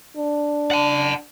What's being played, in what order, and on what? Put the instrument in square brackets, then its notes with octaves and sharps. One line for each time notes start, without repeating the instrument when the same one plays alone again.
[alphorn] D4
[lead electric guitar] F#5 A5